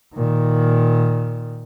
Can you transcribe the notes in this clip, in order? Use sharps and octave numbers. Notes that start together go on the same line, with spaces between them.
A#2 D#3